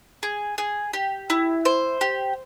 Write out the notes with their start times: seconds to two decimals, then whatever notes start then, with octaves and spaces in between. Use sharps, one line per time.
0.23 G#4
0.58 G#4
0.93 G4
1.30 E4
1.65 C5
2.01 G4